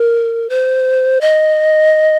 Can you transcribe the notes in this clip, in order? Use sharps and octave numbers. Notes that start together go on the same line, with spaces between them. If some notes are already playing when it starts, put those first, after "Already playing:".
Already playing: A#4
C5
D#5